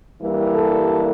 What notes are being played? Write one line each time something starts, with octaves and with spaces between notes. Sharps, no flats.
G2 E3 G3 A#3 E4
A4